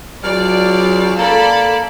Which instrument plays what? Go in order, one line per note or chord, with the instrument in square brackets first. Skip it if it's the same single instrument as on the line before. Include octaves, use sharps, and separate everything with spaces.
[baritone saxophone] C#2 [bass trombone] F#3 [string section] D5 [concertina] F6
[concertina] A#3 [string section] A4 D5 B5